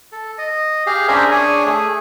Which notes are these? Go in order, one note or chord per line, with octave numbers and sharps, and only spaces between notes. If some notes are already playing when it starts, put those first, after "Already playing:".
A4
D#5
G4 G#4 F5
C#4 D4 G#4 A#4 C5 E5
D4 G#4 C#5 G#5
A3 G#4